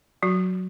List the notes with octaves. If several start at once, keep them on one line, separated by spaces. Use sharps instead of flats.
F#3 F#4